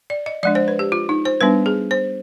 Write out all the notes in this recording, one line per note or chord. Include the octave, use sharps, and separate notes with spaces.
D5
D#5
F3 G#3 D4 D5
C5
B4
G4
F4
D#4
C5
G3 B3 D4 B4
G#4
C5